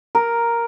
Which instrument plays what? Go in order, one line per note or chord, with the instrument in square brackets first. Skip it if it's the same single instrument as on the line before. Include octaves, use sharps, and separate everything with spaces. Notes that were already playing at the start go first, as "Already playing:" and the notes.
[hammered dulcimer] A#4